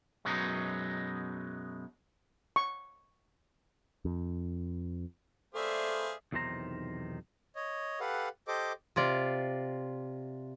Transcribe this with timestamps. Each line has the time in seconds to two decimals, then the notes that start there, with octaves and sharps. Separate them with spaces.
0.25 F#2 B2 F#3 G#3 B3 D#4
2.56 C#6
4.05 F2
5.54 A3 G#4 B4 C5 D5 E5 F5
6.33 B1 E2 C3 D#3 C5 A#5
7.55 C#5 D#5
8.00 G4 A4 B4 F5 F#5
8.48 G4 A4 C5 D#5 D6
8.96 C3 F4 D5